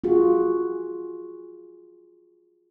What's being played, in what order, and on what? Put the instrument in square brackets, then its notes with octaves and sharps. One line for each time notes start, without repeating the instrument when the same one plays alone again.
[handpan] F4 F#4 G#4